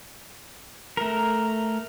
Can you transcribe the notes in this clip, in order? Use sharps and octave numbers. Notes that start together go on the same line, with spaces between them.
A3 A#4